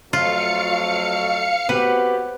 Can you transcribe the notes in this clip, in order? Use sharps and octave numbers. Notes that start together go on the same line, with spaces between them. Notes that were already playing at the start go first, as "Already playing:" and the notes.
F2 F#3 A3 F4 F5 C#7
B3 C4 F#4 G4 B4